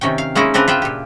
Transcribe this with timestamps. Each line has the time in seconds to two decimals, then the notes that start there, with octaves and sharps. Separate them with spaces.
0.01 C3 D#3 C#4 G5
0.18 F5
0.35 G#3 A#3 C#4 D#4 E4
0.54 C#3 C4 D4 A#4 B4
0.68 F4 B4 E5 G5
0.82 A#2 G4